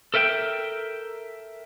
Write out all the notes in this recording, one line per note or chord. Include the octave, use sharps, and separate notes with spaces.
A4 A#4 E5 F#5 G5